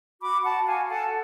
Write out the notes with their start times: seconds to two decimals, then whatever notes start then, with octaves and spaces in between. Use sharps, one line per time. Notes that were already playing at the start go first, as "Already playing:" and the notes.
0.21 F#4 B5 D6
0.43 F#4 F#5 A5
0.65 F#4 F5 G#5
0.88 A4 F#5 A5